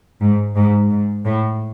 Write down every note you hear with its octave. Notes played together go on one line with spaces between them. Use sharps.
G#2
G#2
G#2
A2